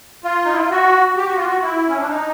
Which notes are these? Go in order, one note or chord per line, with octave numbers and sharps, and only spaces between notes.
F4
D#4
E4
F4
F#4
G4
F#4
F4
F#4
E4
C#4
D4
D#4